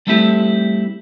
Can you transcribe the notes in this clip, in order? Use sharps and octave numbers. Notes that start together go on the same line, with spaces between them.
G3 A3 C4 E4 G4 A4